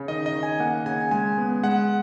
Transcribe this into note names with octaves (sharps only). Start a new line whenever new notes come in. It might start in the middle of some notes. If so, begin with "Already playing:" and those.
Already playing: C#3
D#3 D#5
D#5
D#3
G#5
A#3 F#5
C#3 G#5
G#3 G#5
B3
G#3 F#5